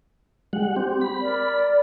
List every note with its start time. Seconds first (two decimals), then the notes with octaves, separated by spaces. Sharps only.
0.53 G3 G#3 F#5
0.76 C4 G4
1.01 B5
1.21 A#4 D5